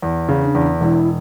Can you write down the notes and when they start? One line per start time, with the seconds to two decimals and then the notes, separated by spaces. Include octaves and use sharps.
0.02 E2
0.29 C#3
0.42 D4
0.55 E2
0.81 E1 E4